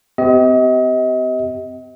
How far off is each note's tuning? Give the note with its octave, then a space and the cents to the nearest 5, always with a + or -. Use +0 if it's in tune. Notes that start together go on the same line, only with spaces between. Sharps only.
C4 -40 G4 -20 D#5 +35